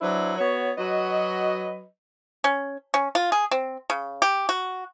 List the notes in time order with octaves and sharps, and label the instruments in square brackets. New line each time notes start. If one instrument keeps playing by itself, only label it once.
[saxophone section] F#3 D4 E4 B4 C5
B3 F#4 C#5
F#3 F#4 B4 D#5
[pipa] C#4
C#4
F4
G#4
C4
C#3
G4
F#4